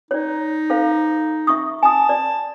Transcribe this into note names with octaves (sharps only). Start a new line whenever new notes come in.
D#4 C#5 D5
A4 C5 F5
E5 C#6 D#6
G#5 A5 D#6
D5